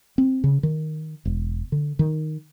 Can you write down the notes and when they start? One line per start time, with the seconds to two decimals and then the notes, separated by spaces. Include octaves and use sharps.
0.18 C4
0.44 C#3
0.63 D#3
1.25 E1
1.72 D3
1.99 D#3